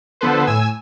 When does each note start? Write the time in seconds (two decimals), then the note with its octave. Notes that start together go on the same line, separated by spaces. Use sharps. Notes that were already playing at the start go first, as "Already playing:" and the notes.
0.21 D3 F3 B3 A4 B4 C5
0.47 A2 G#5 E6